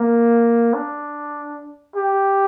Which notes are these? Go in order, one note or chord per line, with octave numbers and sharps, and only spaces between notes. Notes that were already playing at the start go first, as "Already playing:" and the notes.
Already playing: A#3
D4
G4